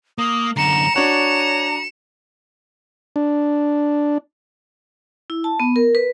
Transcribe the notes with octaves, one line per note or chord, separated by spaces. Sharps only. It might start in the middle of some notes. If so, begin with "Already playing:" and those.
A#3 D#6
F#2 D3 A#5 C#7 E7
D4 F#4 C#5 A#5
D4
E4
A5
B3
A#4
B4